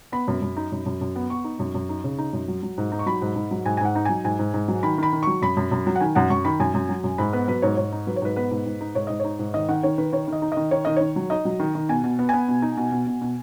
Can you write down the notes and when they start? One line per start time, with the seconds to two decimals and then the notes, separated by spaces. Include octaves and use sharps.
0.12 B3 B5
0.28 F#2
0.42 F#2
0.57 D#4
0.72 F#2
0.86 F#2
1.01 F#2
1.16 B3
1.30 B3 C#6
1.44 D#4
1.59 F#2
1.75 F#2
1.89 D#4
2.04 C#3
2.18 D#4
2.33 F#2
2.48 F#3
2.63 F#3
2.78 G#2
2.92 D#4
2.99 C#6
3.06 F#3 B5
3.22 G#2
3.36 G#2
3.51 F#3
3.65 G#2 G#5
3.77 G#5
3.81 G#2 F#5
3.95 D#4
4.05 F#3 G#5
4.24 G#2 G#5
4.39 G#2
4.54 G#2
4.68 F#3
4.83 D#3 B5
4.98 D#3 B5
5.13 D#3
5.23 F#3 C#6
5.42 F#2 B5
5.57 F#2
5.71 F#2
5.87 F#3
5.96 F#5
6.00 D#3 G#5
6.15 F#2 F#5
6.30 F#2 C#6
6.45 D#3 B5
6.60 F#2 G#5
6.75 F#2
6.89 F#3
7.04 F#2
7.18 G#2 B5
7.33 B3 B4
7.48 F#3 B4
7.62 G#2 C#5
7.77 G#2 C#5
7.92 D#4
8.07 F#3 B4
8.16 C#5
8.22 G#2 B4
8.36 B3 B4
8.51 G#2
8.66 G#2
8.81 D#4
8.95 G#2 C#5
9.07 G#2 D#5
9.20 D#4 C#5
9.39 G#2
9.54 D#3 D#5
9.68 D#3 F#5
9.83 D#3 C#5
9.98 D#3 B4
10.12 D#3 C#5
10.28 D#3
10.33 D#5
10.42 D#4
10.52 D#3 D#5
10.71 D#3 C#5
10.85 D#3 D#5
10.96 D#3 C#5
11.16 F#3
11.30 D#4 D#5
11.45 F#3
11.59 D#3
11.75 D#3
11.89 B2 G#5
12.04 B2
12.19 B3
12.29 B3 G#5
12.48 B2
12.62 D#4
12.77 B2
12.92 B2
13.07 B2
13.21 B2